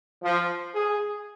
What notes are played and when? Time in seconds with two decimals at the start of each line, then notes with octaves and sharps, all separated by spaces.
0.23 F3
0.75 G#4